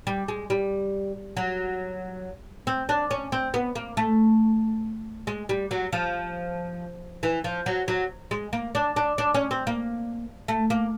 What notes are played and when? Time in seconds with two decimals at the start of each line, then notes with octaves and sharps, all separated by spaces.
0.07 G3
0.28 G#3
0.50 G3
1.37 F#3
2.67 C4
2.89 D4
3.11 C#4
3.32 C4
3.54 B3
3.75 A#3
3.97 A3
5.27 G#3
5.49 G3
5.71 F#3
5.93 F3
7.23 E3
7.44 F3
7.66 F#3
7.88 F#3
8.31 G#3
8.53 A#3
8.75 D4
8.96 D4
9.18 D4
9.34 C#4
9.51 C4
9.67 A#3
10.48 A3
10.70 A#3